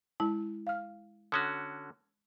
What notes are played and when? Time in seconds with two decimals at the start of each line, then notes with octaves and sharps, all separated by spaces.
0.20 G#3 E4 A5
0.67 F5 F6
1.32 D3 C#4 F#4 D#6